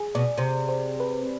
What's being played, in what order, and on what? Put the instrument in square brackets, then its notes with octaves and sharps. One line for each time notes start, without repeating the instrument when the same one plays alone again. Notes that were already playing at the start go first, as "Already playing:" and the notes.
Already playing: [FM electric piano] G#4
[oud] B2 [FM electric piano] D5
[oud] C3 [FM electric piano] C5
[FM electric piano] C5
B4